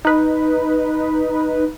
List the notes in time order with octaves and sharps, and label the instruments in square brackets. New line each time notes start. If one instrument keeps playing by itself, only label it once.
[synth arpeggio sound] D#4 B4